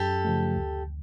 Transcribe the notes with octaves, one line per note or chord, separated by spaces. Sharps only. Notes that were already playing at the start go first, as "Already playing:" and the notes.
Already playing: F#2 G4 A4
C#3 F3 A3
D2